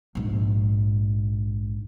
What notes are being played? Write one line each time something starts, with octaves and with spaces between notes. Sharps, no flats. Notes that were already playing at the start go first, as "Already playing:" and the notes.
A#1 G#2